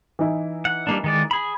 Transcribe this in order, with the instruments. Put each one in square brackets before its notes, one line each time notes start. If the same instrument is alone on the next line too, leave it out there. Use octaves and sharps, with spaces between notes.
[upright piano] E3 D#4 E4
[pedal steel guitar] F#5
G3 A#3 D4
D#3 G#3 D5
G#4 B5